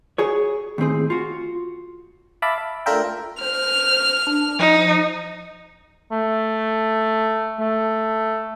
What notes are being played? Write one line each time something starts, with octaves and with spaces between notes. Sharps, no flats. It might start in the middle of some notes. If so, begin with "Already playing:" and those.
F#4 G#4 C#5
D#2 A2 C4 G#4
F4 F#4
E5 F5 A5 B5 D6
E5
A3 D4 F4 A#4 E5 G5
C5 F6
D4
F3 D#4
A3
A3